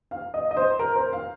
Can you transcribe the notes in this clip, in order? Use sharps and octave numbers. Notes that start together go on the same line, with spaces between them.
F5
D#5
D#5
C5
A#4
C5
F5